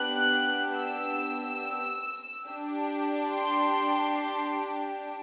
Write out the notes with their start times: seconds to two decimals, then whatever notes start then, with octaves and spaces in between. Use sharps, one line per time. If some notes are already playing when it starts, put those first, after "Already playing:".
Already playing: B3 D4 G4 F#6
0.77 E6
2.45 D4 G4
3.29 C6